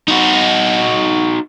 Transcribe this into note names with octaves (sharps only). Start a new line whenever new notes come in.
D#4 F#4